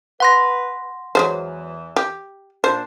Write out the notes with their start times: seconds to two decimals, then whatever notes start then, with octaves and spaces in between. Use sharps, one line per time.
0.20 B4 F#5 C6 A#6
1.15 E2 E3 F#3 G#3 C5
1.96 G4
2.64 A#2 D4 C5